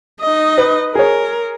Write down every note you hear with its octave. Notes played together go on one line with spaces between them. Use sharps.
D#4 D#5
B4
G#4 A#4 C#5